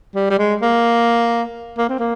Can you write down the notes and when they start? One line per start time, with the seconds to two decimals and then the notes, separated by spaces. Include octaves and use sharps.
0.15 G3
0.30 G3
0.38 G#3
0.62 A#3
1.78 A#3
1.89 C4
1.99 A#3